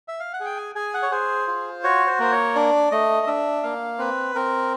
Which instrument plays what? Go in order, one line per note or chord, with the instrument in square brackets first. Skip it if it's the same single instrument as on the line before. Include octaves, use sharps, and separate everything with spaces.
[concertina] E5
F5
F#5
G#4 G5
G#5
G#4 G#5
F#5
C#5
G#4 C5
F4
F#4 C#5
C5
A#3 C5
C#5
D4 D5
A3 D#5
D4 E5
A#3 F5
C4 B4
C4 A#4